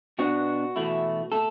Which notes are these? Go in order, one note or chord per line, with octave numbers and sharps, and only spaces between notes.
B2 B3 D4 F#4
E2 B2 A3 E4
B2 A3 A4